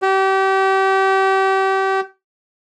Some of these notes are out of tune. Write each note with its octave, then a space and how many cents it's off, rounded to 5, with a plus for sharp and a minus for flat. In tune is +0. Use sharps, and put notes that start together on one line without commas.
G4 -30